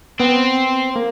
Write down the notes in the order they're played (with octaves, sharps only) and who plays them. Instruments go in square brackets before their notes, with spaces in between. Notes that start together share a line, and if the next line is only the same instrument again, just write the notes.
[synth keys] B3 [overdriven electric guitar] C4
[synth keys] A#3